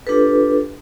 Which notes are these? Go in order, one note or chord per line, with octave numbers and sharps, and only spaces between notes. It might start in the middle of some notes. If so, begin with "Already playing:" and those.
D4 F4 G4 A4 B4